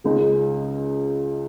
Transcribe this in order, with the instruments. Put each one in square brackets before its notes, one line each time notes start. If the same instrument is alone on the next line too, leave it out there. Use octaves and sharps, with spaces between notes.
[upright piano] C#2 C#3 G#3 D#4